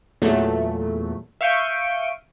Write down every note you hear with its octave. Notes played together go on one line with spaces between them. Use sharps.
E2 A#2 F#3 A3
E5 F5 C#6 G6 D7 D#7